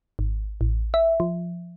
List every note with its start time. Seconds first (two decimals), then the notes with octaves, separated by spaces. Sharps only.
0.19 G#1
0.61 A1
0.94 E5
1.20 F3